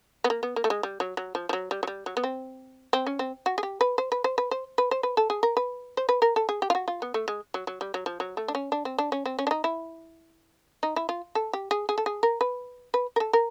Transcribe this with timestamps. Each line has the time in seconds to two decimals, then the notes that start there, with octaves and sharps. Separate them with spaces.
0.24 B3
0.30 A#3
0.43 B3
0.56 A#3
0.64 A3
0.70 G#3
0.83 G3
1.00 F#3
1.17 F#3
1.35 F3
1.49 F3
1.53 F#3
1.71 G3
1.83 F#3
1.87 G3
2.06 F#3
2.17 B3
2.24 C4
2.93 C4
3.07 C#4
3.19 C4
3.46 F#4
3.58 G#4
3.63 G4
3.81 B4
3.98 C5
4.12 B4
4.24 C5
4.38 B4
4.51 C5
4.78 B4
4.91 C5
5.03 B4
5.17 A4
5.30 G#4
5.43 A#4
5.57 B4
5.97 C5
6.09 B4
6.22 A#4
6.36 A4
6.49 G#4
6.62 G4
6.70 F4
6.75 F#4
6.88 F4
7.02 B3
7.14 A3
7.28 G#3
7.54 F#3
7.67 F#3
7.81 G3
7.94 F#3
8.06 F3
8.20 F#3
8.37 A3
8.48 D4
8.55 C#4
8.72 D4
8.85 C4
8.98 D4
9.12 C#4
9.26 C4
9.39 C#4
9.47 D4
9.51 D#4
9.64 E4
10.83 D#4
10.96 E4
11.09 F4
11.35 A4
11.53 G4
11.71 G#4
11.89 G#4
11.98 A4
12.06 G#4
12.23 A#4
12.41 B4
12.94 B4
13.16 A#4
13.20 A4
13.33 A#4